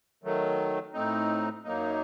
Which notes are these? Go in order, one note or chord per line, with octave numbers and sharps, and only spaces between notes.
D#3 F#3 A3
A2 A3 C4 D#4
F#2 F#3 A#3 D#4